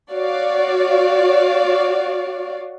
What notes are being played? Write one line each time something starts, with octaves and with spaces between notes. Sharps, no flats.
F#4 C#5 D5 F5